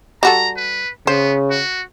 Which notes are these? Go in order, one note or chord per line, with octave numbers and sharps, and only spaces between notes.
G3 F#4 A4 A#5
B4
C#3 B3 C5
F#4